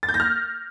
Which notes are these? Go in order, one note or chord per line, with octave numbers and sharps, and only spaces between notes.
A6
G6
A#6
F6